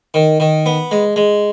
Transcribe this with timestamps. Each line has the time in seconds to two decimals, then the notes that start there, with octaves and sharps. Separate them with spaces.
0.14 D#3
0.40 D#3
0.66 B3
0.91 G#3
1.16 G#3